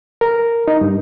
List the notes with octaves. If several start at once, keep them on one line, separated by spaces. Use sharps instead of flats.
A#4
D#4
G2